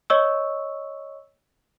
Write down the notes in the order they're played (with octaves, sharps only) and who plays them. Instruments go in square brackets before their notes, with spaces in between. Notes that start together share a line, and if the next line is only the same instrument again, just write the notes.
[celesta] C#5 D#5 C#6 E6